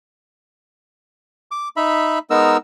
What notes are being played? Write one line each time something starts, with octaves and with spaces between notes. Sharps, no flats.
D6
D#4 E5 B5
G#3 B3 D#4 A#4 E6